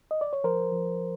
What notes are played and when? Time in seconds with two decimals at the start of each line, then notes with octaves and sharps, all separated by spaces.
0.11 D#5
0.21 D5
0.33 C#5
0.44 F3 A#4 C5
0.72 F3